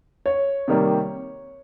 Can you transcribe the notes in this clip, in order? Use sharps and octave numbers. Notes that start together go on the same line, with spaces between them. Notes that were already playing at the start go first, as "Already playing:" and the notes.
C#5
C3 D#3 G3 A#3